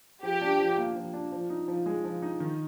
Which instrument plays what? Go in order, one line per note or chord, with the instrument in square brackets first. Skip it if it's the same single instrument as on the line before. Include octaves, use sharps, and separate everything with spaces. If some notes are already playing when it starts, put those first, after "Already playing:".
[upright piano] F3 [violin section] G4
[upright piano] D4
F3
A#3
F3
D4
F3
D#4
F3
G#3
F3
D#4
D#3